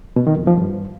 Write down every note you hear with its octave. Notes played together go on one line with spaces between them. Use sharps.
B2
D#3
F2
F3
G2